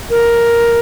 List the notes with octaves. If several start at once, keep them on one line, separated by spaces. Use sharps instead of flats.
A#4